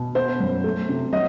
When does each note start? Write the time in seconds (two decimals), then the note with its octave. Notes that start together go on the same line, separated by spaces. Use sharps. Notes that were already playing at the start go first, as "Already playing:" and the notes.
Already playing: B2
0.15 B3 C5
0.40 F#2
0.64 A3
0.89 C3
1.13 F#3 D#5